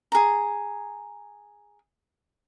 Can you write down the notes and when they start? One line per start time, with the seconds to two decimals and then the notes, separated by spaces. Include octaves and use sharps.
0.12 G#4 A#5